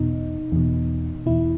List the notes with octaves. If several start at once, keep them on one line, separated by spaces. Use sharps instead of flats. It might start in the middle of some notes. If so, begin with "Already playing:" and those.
Already playing: E2 B2 D#4
E2 B2
E2 B2 E4